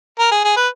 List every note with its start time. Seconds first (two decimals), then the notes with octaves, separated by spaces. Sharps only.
0.19 A#4
0.31 G#4
0.44 G#4
0.56 B4